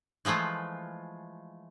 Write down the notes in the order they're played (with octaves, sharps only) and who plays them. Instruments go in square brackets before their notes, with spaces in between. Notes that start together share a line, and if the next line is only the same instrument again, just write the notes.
[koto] E3 F3 G#3 A3 F4